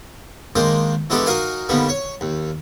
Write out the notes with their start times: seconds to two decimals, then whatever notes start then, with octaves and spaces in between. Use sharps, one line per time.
0.56 D#3 G#3 A#3 D4 C5
1.10 E3 G#3 B3 D4 G4 A4
1.26 D#4 F#4 A#4 F5 G#5
1.69 D3 D#3 G3 A#3 B3
1.89 C#5
2.21 D#2